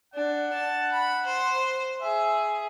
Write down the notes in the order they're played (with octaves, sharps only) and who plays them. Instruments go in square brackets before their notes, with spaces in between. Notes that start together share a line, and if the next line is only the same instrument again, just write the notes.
[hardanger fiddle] D4 [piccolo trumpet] F#5
[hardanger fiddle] A5
B5
C5
[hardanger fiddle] G#4 [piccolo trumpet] E5